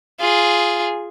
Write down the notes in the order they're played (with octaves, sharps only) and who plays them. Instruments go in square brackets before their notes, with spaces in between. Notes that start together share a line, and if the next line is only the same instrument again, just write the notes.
[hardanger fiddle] F4 G#4